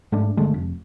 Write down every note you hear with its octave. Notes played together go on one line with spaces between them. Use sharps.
G#2 A3 D4
G1 D3 G#3 A3
F1